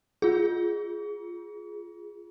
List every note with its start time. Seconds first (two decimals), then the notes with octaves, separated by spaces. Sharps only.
0.22 F4 G#4